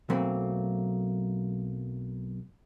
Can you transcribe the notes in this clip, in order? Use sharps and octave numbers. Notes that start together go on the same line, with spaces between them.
B1 F#3 A3 A#3 C4 B5